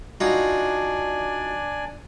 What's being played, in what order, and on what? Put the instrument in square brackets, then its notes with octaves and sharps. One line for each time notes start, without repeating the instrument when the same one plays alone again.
[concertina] D4 D5 G#5 [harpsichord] D#4 F4 F#4